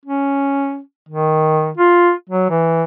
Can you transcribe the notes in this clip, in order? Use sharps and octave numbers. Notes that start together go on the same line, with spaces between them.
C#4
D#3
F4
F#3
E3